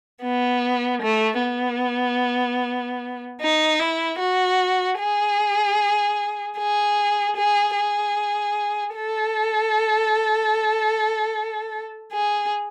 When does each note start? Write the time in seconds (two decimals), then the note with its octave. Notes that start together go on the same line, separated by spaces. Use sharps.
0.23 B3
1.02 A3
1.42 B3
3.41 D#4
3.79 E4
4.19 F#4
4.99 G#4
6.58 G#4
7.36 G#4
7.77 G#4
8.95 A4
12.13 G#4